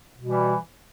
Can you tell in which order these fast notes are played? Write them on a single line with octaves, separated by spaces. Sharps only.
B2 G3 E3